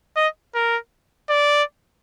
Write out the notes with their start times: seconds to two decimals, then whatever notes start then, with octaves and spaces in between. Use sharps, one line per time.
0.16 D#5
0.55 A#4
1.29 D5